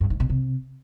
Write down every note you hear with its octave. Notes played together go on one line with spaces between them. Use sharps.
G2
G#2
B2
C3